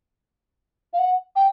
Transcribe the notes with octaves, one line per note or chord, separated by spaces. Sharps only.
F5
F#5
G5